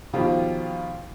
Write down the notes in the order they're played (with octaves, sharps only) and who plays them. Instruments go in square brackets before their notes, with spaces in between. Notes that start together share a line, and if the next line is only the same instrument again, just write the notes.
[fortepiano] B2 D#3 F3 F4 G4